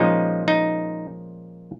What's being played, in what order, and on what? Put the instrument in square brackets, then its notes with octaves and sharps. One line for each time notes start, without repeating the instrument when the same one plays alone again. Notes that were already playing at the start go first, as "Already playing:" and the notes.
Already playing: [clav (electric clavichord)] A#2 F3 G#3 C#4 D#4
D#4